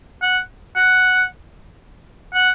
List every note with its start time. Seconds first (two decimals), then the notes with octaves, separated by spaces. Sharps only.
0.22 F#5
0.76 F#5
2.34 F#5